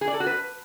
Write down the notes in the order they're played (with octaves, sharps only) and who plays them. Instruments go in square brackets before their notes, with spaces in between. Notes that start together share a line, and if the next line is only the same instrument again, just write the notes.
[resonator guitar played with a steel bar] G#4
D5
A4
F#4
B4